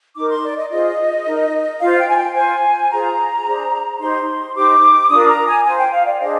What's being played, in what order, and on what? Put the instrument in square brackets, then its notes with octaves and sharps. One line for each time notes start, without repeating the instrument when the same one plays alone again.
[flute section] D#4 A#4 D6
C6
D5
D#5
F4 G#4 C5 D#5
D#4 A#4
F4 C5 F5
G5
G#5
G5
F4 C5 G#5
F4 G#4 C5 A#5
D4 G#4 C5
D#4 G4 C5 C6
D#4 G4 C5 D6
D4 F4 A#4 D#6
A#5
G#5
F4 C5 G#5
G5
F5
D5
D4 G#4 C5 D#5